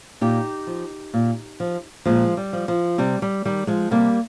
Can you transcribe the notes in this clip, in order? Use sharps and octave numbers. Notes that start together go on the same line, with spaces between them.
A#2 D#4 G4
F3
A#2
F3
A#2 F3 G#3
G3
F3
F3
C3 G3
G3
D#3 G3
F3 G#3
C3 G3 A#3